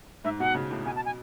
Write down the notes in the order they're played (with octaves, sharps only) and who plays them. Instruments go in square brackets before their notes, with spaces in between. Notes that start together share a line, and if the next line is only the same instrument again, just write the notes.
[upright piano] G#2 [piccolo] E5
[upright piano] B2 [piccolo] F#5
[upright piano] C#3
A2
[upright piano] B2 [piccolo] G#5
[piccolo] A5
G#5